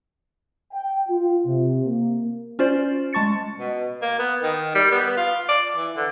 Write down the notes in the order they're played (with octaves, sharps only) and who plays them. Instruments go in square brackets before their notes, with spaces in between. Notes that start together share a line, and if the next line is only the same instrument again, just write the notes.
[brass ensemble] G5
F4
C3
A#3
[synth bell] C#4 F4 C5 D5
G#3 A5 C#6 A6 C#7
[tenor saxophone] B2
A#3
B3
D#3
G3
B3
F4
D5
E3
D3